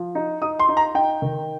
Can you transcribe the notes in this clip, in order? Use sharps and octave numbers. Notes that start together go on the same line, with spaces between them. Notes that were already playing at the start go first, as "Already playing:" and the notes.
Already playing: F3
D#4
D#4 D#6
C6
D#4
A#5
D#4 G5
D#3